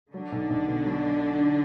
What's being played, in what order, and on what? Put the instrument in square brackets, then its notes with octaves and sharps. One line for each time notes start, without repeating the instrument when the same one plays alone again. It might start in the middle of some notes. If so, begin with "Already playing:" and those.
[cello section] D3 D4 [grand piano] F#3
[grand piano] B1
B1
B2
F#3